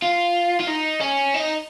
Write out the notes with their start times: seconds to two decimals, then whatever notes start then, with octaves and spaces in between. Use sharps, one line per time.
0.02 F4
0.60 F4
0.68 D#4
1.01 C#4
1.34 D#4